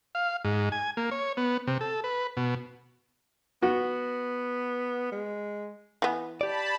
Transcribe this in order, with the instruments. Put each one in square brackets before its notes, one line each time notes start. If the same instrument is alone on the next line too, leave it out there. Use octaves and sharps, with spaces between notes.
[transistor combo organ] F5
G#2
G#5
A#3
C#5
B3
C3
A4
B4
B2
[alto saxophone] B3 [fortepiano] F#4
[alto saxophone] G#3
[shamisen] E3 B3
[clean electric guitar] G4 D5 [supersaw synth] A5 B5